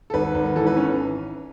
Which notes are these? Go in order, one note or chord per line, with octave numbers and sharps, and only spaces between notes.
A4
G#1 B4
G#1
E3 A4
B4
C#4